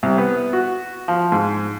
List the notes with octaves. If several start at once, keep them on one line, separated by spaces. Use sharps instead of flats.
C2
B3
F#4
F3
G#2